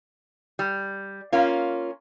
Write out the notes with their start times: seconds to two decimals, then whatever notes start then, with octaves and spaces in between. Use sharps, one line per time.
0.59 G3
1.32 A#3 C#4 F4